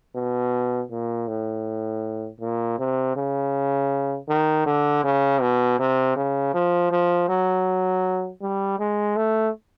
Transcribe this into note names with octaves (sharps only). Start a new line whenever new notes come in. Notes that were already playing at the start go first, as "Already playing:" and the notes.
B2
A#2
A2
A#2
C3
C#3
D#3
D3
C#3
B2
C3
C#3
F3
F3
F#3
G3
G#3
A3